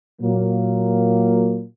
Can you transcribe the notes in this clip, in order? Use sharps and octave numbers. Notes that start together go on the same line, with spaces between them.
A#2 F#3 A#3